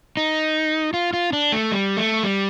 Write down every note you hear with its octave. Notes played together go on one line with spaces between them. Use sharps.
D#4
F4
F4
D4
A3
G3
A3
G3